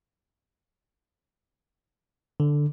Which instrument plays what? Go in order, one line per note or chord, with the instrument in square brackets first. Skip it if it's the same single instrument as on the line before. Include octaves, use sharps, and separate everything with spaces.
[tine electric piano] D3